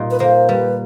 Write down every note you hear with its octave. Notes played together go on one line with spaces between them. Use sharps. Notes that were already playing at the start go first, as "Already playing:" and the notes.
Already playing: A#2 G3 D#4
B4
A#3 C5
G3 B4